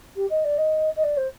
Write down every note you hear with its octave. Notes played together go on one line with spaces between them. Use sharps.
G4
D#5
D5
D#5
D#5
D5
C5